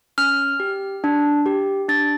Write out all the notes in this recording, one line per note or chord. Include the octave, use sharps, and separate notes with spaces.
C#4 F6
G4
D4
G4
D4 A6